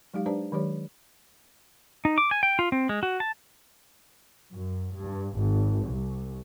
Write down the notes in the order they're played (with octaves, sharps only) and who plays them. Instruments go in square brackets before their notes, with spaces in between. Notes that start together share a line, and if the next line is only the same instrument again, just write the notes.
[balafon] F#3 G#3 D#4 G4 F5
D4 G4 B4 C5 D5 A5
D#3 F#3 G#3 G4 C#5 D5
[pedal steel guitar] D#4
D6
G#5
G5
F4
C4
G#3
F#4
A5
[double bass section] F#2
G2
G#1
C2